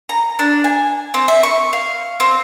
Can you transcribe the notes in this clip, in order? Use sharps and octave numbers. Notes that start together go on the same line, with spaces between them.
A#5
D4
G#5
C4
E5
C#6
F5
C4